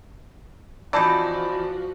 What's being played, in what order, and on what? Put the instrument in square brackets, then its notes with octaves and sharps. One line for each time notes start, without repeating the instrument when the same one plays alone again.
[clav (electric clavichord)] E3 C4 D#4 [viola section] F3 F#4 [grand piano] D5 A5 B5